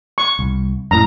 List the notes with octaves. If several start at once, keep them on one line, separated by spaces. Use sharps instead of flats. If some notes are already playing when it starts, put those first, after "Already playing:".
C#6
C2
F#2 A2 A#5